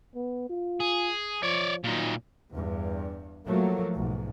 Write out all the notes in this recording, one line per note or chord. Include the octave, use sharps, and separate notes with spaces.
B3
F4
G#4
F3 C#5 D5
A#2 F#3 D#4
E2 G2
F3 F#3 A3 A#3
B1 G#2